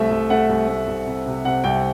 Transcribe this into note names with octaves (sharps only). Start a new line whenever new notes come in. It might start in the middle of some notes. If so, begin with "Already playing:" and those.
Already playing: C2 A3 E5
C2
A3 F#5
C2
A3
C2
C3
C3
C3 F#5
C2 G5